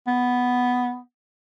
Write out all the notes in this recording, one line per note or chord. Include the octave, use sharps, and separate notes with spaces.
B3